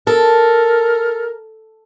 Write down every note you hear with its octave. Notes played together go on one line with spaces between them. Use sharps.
A4 A#4